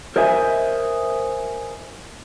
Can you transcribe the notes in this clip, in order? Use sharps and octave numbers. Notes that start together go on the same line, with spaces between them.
A#4 C5 D#5 E5 G#5